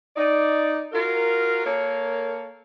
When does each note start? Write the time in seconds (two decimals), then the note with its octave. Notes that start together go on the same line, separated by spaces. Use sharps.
0.16 D#4 D5
0.92 F4 F#4 A#4
1.65 A#3 A4 A#4 C#5